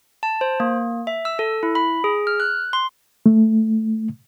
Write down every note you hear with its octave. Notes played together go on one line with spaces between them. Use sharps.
A5
C5
A#3
E5
E6
A4
E4
B5
G#4
F6
F#6
C6
A3